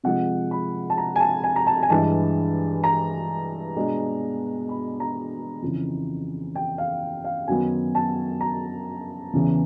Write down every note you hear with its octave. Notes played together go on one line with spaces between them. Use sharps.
C3 F3 G#3 F#5
B5
A5
A#5
G#5
A5
G#5
A#5
A5
G#5
G2 E3 G#3 A5
A#5
B2 G#3 B3 D4
B5
A#5
F2 C#3 E3
G5
F5
F5
F#2 D#3 F#3 B3 G#5
A5
A#5
E2 C#3 E3